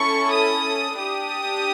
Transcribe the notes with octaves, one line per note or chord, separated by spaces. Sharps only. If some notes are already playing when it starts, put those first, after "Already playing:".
Already playing: C#4 E4 A4 C#6
D#6
D4 G4 D#6